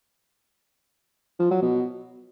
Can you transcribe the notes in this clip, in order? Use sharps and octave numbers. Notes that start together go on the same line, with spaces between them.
F3
F#3
B2